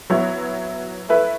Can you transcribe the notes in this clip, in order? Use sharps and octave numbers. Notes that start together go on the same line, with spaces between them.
F#3 B3 E4 C#5
A3 E4 B4 E5